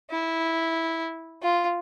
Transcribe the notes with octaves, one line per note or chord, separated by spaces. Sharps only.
E4
F4